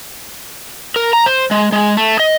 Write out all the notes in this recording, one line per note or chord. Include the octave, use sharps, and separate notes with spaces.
A#4
A#5
C5
G#3
G#3
A3
D#5